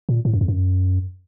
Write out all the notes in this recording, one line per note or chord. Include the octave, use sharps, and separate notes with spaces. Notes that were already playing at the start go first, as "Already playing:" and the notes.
A#2
A2
F#2
F2
F#2